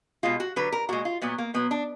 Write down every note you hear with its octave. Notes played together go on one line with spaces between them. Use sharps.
B2 G#3 F4
F#4
D3 F#3 B4
A#4
A#2 G#3 F#4
F4
A#2 F#3 B3
A#3
B2 F#3 B3
D4